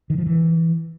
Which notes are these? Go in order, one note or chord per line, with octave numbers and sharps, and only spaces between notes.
D#3
F3
E3